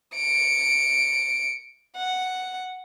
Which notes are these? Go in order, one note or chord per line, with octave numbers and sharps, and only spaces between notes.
C#7 D7
F#5